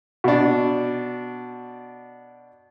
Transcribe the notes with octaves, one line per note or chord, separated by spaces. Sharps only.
B2 D4